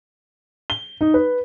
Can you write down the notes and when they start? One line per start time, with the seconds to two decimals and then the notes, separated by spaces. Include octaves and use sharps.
0.70 G7
1.01 D#4
1.14 B4